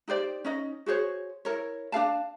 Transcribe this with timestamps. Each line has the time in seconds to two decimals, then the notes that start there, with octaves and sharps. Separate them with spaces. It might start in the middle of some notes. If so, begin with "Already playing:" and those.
0.08 D#4 G4 C5 D5
0.44 C#4 D#4 D#5
0.86 F#4 G#4 C5 C#5
1.45 E4 A#4 C#5
1.92 D4 G#4 F5 A5